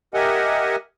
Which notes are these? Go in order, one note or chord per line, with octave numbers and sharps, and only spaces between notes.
G4 A#4 D#5 E5 F#5 G#5